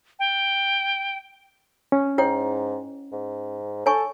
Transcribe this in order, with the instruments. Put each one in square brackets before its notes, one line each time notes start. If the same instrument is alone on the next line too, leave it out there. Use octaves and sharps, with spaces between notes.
[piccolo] G5
[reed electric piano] C#4
[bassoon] G#2 [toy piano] E4 C#5 G5
[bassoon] G#2
[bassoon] A4 [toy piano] C#5 G#5 C#6